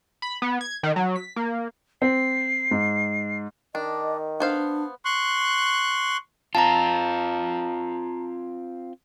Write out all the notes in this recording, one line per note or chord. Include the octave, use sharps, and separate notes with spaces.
B5
B3
G#6
D#3
F#3
B6
A#3
C4 C7
G#2
D#3 D4 D#5
B3 D4 C5 F5
C6 C#6 F#6
C4 F4 A5 A#5